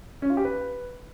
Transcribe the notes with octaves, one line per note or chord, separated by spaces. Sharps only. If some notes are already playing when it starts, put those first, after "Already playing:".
C#4
F4
G4
B4